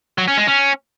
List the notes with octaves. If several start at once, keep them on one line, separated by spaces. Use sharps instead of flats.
F#3
C#4
G#3
C#4